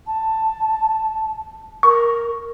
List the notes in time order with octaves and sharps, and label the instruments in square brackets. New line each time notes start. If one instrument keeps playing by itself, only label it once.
[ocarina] A5
[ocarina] A#4 [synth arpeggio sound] C#6